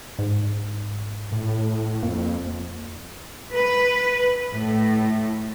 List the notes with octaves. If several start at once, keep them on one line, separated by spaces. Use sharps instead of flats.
G#2
A2
F2 A#3
B4
A2